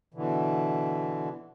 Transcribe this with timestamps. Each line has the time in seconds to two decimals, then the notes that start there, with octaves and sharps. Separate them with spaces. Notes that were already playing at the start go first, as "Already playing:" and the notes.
0.14 B2 D3 E3